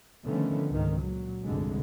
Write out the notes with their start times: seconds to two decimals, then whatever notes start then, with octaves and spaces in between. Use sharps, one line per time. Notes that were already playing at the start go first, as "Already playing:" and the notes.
0.25 D3 D#3 F3 A3 B3 C#4
0.70 C#2 G#2 D#3
1.00 A#2 F#3
1.44 F1 C2 G2 D3 G#3